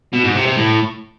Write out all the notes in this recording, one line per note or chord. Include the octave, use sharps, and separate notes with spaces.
B2
G#2
C3
C3
A2